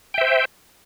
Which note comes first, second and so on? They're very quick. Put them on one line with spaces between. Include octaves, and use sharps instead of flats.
G5 E5 C5